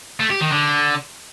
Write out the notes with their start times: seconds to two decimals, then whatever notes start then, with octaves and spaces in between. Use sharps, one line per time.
0.20 A3
0.30 G4
0.41 D#3
0.51 D3